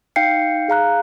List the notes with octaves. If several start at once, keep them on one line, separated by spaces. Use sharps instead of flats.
D#4 F5 G5 G6 C7 C#7
G#4 F5 A#5 F#6